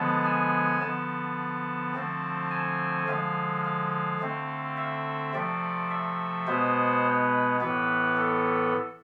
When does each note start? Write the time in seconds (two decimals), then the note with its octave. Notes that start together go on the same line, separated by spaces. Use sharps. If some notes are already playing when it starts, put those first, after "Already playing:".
Already playing: D3 F3 G#3 B3 A5
0.25 G#5
0.81 D3 F3 B3 A5
1.95 D3 F3 A3 C4
2.51 G#5
3.08 D3 F3 G#3 F5
3.64 F5
4.21 D3 A3 C4
4.77 E5
5.34 C3 F3 A3 D5
5.90 E5
6.47 B2 G#3 B3 C5
7.60 A2 E3 B3 B4
8.17 A4